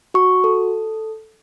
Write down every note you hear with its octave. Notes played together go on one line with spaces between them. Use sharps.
F#4 C#6
A4